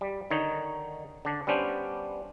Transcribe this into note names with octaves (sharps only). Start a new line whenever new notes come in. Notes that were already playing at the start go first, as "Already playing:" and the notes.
G3
D3 D#3 D#4 C#5
D3 D4
G3 B3 C#4 D4 C5